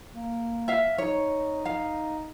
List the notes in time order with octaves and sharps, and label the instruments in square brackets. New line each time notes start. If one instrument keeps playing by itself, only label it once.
[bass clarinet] A#3
[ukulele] E5 F5
[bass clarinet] D#4 [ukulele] C#5
[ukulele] F5